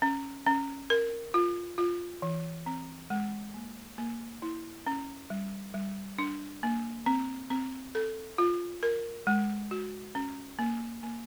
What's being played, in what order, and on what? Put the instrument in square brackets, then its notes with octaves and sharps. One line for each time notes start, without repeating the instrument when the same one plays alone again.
[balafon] C#4
C#4
A#4
F4
F4
E3
C4
G#3
A#3
A#3
E4
C#4
G3
G3
D4
A#3
C4
C4
A4
F4
A#4
G#3
F#4
C#4
A#3
A#3